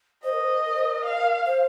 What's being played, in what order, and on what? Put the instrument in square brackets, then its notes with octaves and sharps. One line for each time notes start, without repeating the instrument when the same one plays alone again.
[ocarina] C5 [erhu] D#5
[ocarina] A#4
C5
A#4
C5
A#4
[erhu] F5
[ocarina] C5